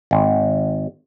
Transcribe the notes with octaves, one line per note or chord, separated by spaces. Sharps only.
G#1